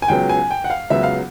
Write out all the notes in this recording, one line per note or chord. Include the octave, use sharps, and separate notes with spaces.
G#5
C#2 C#3 F#3 B3 G5
G#5
G5
F#5
F5
C#2 C#3 F#3 B3 E5
F5